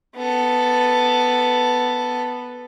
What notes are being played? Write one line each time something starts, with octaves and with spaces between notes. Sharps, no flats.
B3 A4